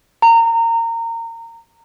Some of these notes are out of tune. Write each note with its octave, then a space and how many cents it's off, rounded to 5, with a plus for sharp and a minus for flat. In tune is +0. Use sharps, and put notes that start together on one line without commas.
A#5 -25